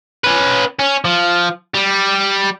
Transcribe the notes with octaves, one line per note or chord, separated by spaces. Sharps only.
C#4 B4
C#4
F3
G3